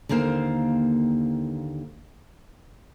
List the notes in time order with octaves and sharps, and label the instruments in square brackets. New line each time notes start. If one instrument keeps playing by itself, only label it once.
[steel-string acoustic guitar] D#2 D3 A#3 C5 F5